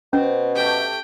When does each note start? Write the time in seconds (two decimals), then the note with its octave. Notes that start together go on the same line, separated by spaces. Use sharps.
0.13 B2 C4 C#4 C5
0.55 A3 G4 G5